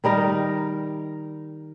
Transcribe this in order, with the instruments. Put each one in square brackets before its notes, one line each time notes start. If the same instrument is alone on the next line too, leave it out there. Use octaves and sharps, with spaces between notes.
[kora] D#3 G3 D#4 A#4